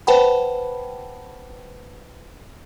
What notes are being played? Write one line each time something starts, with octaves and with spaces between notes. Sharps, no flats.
B4 C5 F#5 G5 A5 B5